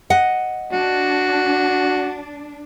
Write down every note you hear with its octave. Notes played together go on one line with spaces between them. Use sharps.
D#5 F#5
D4 F#4